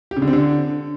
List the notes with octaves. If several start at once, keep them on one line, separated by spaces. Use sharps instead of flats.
G4
C#3
D3
C4
D3